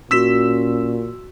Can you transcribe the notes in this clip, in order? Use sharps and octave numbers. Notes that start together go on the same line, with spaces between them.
A#2 C#4 F#4 C6 E6 B6 E7